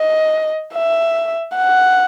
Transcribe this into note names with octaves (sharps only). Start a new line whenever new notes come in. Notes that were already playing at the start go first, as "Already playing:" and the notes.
Already playing: D#5
E5
F#5